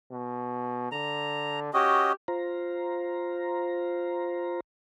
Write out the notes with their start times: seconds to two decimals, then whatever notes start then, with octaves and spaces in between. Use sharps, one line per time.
0.11 B2
0.92 D3 A#5
1.74 C#4 F#4 G4 D#5
2.28 F4 C5 A#5